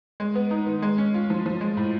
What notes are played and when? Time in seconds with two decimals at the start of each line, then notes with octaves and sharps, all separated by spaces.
0.20 G#3
0.35 B3
0.51 D#4
0.67 D#3
0.82 G#3
0.98 C#4
1.14 F4
1.30 F3
1.46 F3
1.61 G#3
1.77 A2